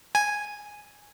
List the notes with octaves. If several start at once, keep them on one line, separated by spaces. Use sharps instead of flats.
G#5